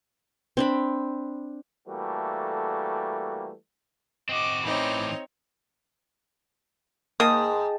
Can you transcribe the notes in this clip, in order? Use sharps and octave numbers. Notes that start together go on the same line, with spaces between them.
C4 D4 B5
E3 G3 A3 A#3 F#4 A4
C4 F#4 D#5 D6
A2 E3 C4 D#4 C#5 B5 D6
G#2 A#3 D#5 G5 A5 D#6